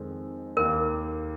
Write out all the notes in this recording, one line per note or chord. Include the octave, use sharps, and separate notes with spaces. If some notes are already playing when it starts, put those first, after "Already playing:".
Already playing: F2 D#3 G#3 C4 G#4
D#2 D#3 A#3 A#4